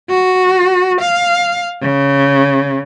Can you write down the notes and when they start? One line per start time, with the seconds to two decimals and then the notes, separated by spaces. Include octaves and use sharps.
0.10 F#4
1.01 F5
1.82 C#3